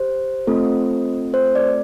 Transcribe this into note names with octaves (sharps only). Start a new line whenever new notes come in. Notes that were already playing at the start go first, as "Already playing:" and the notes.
Already playing: G4 C5
A3 C4 F4 A4
C5
D5